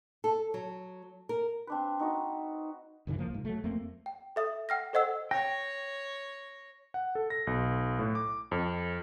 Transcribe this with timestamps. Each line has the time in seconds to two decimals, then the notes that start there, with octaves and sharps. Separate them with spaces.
0.24 A4
0.54 F#3
1.29 A#4
1.67 C4 D4 B4
2.00 D#4 F#4 D#5
3.07 C#2 F#2 D3 E3
3.19 F3 A#3
3.30 C2 G#2
3.45 F#3 A3
3.64 F2 A3 A#3 C4
4.06 G5
4.36 A4 E5 D#6
4.69 F#5 G5 F6 A#6
4.93 A4 C5 D#5 F#5 E6
5.31 C#5 G5 A#6
6.94 F#5
7.15 A4
7.30 A#6
7.47 B1
7.99 A2
8.15 D6
8.52 F2